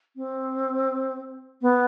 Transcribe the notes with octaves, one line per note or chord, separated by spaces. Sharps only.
C4
B3